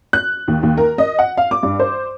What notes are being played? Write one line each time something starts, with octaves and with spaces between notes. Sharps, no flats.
F#6
D#2
D#2
A#4
D#5
F#5
F5
D6
G2
C5